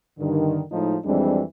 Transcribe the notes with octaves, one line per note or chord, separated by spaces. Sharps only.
G2 D3 D#3
A2 F3 G#3 D#4
F2 E3 G3 G#3 C4 D4